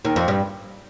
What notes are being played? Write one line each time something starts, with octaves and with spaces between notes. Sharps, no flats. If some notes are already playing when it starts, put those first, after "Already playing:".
D#2 D#3
F2 F3
G2 G3